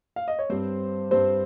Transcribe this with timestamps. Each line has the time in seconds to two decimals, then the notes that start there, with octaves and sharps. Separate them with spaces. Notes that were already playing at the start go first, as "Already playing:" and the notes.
0.16 F5
0.28 D#5
0.39 C#5
0.50 G2 G3 C4 C5
1.11 G2 G3 C4 C5